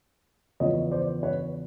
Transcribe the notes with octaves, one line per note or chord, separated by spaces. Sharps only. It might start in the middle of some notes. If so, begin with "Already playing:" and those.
E2 C#3 F3 C#5 D#5
C5 D5
B4 C#5